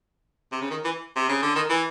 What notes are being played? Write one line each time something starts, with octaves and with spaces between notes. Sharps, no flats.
C3
C#3
D#3
E3
C3
C#3
D3
D#3
E3